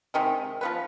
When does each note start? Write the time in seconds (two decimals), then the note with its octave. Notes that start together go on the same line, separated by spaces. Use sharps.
0.14 C3 D#3 G#3
0.61 F3 B3 F4 B4